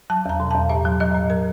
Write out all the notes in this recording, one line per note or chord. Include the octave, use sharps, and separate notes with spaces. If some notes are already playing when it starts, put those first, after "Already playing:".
F#3 A5
E2 A#5
B2
E2 A5
A2 E5
F#3
F#3 D#5
A2
A#4